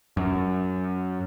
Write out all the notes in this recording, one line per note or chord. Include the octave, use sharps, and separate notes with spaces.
F#2